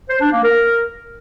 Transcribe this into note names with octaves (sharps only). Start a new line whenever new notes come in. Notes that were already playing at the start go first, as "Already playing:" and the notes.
C5
D4
A#3
A#4